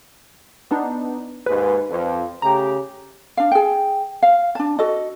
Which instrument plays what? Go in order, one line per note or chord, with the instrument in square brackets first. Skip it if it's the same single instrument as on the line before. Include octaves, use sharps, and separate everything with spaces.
[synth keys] B3 D4 D#4
[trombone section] D#2 G#2 [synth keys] B4
[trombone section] F2
[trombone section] C#3 A3 G4 [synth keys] A#5
[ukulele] D4 F5
G#4 G5
F5
D4 A5
F#4 A4 D#5